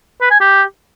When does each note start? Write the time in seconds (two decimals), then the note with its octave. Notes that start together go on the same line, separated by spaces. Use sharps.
0.21 B4
0.31 G#5
0.40 G4